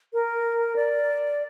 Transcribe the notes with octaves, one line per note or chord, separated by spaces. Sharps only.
A#4
D5